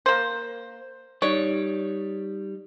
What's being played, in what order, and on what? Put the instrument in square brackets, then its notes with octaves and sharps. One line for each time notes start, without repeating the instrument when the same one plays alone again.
[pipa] A#3 C5
[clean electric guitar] G3 D#4 D5 [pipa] C#5